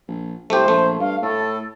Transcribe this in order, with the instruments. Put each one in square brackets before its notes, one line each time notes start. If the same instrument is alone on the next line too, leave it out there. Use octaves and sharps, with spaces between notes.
[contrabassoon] A#1
[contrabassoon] C2 [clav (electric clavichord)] A3 G4 [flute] C5
[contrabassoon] A#1 [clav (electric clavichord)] A3
[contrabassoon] G2 [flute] F5
[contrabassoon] A2 [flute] A4